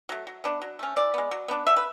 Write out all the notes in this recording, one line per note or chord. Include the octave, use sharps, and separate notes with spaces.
F#3 A3
F#3
B3 D4
F#3
A3 C#4
E3 D5
G#3 B3
F#3
B3 D4
D3 E5
B4